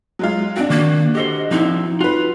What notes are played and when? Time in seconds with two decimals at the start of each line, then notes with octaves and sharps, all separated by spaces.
0.19 F#3 G#3 F4
0.56 C4 D4 F#4
0.70 D#3 A#3
1.15 G4 A4 C5 D#5
1.51 F3 C4 D#4 E4
2.01 F4 F#4 B4